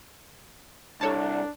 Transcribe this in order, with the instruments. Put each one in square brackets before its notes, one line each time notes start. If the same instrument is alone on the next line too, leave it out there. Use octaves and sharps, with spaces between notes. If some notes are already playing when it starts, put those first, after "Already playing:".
[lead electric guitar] C2 [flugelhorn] D4 [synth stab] A4 C#5 A5